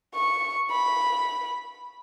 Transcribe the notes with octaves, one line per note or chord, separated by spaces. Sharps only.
C#6
B5